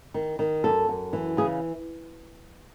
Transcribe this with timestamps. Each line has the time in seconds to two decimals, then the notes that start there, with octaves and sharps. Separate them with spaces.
0.14 D#3
0.39 D#3
0.64 F#2 A4
0.89 F#2
1.13 E3
1.37 C#3 G#4